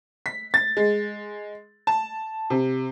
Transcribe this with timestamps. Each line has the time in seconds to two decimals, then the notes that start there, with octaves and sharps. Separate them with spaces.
0.26 B6
0.54 A6
0.77 G#3
1.87 A5
2.50 C3